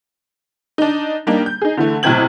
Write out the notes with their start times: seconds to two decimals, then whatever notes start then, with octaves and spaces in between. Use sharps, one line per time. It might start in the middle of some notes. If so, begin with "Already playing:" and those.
0.78 D4 D#4
1.27 G3 A#3 D4 D#4
1.46 G6
1.62 D#4 G#4
1.77 D3 E3 A3
2.03 B1 A2 C3 C4 G#6 F#7